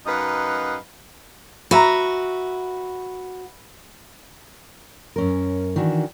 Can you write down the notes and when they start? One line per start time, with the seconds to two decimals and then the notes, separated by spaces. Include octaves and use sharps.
0.06 F#2 D#4 B4 D#5 F5 F#5
1.71 F#4 B4 E5 A#5
5.16 F#2 C#4 A#4
5.76 D#3 E3 D4 F#4